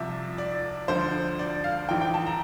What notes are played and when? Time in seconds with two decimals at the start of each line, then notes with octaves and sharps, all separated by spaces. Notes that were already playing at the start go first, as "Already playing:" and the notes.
Already playing: C2 C3 F3 E5
0.38 D5
0.88 D2 D3 F3 C5
1.39 D5
1.64 F5
1.89 A#1 A2 E3 G5
2.01 G5
2.14 A5
2.27 A#5